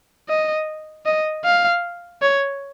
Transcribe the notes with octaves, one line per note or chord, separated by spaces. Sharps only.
D#5
D#5
F5
C#5